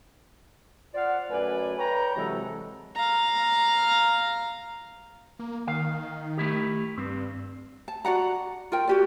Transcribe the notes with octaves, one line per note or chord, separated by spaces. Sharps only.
F4 C5 D5 F5 F#5
F#2 A3 B4 D5 G#5
B4 C#5 G5 A#5
C3 E3 F#3 G#3 F#4 A4
F5 A#5
A#3
D#3 F5
A3 E4 G4
G2 C4
A5
F#4 D5 F#5 A#5
F4 A#4 G5
F#4 G4 D5